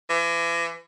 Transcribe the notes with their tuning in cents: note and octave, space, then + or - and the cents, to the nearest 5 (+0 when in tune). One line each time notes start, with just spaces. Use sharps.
E3 +40